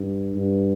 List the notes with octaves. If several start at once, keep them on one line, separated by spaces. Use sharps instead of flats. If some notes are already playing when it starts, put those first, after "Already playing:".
Already playing: G2
G2